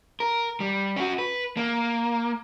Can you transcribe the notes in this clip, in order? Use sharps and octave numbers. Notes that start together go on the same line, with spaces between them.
A#4
G3
C#4 F#4
B4
A#3